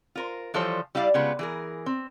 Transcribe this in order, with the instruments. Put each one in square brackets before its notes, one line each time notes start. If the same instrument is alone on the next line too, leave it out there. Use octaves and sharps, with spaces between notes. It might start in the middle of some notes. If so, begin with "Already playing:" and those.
[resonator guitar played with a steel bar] F4 A#4 C5
E3 F3 G3 A4 C5 C#5
G3 E4 D5 F5
C#3 G3 G#3 B3 F4
E3 G#4 A#4
C4